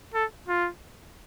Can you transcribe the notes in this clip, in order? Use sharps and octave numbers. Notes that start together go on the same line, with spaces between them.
A4
F4